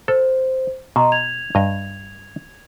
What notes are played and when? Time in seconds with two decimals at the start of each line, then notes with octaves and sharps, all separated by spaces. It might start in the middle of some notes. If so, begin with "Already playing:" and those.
0.08 A4 C5
0.96 B2 D#5 A#5 C6
1.12 G#6 F7
1.55 G2 D#5